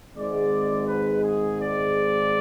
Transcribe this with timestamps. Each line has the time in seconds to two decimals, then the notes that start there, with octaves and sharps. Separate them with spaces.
0.16 G#1 G#2 G#3 D5
0.86 B4
1.22 G#4
1.58 D5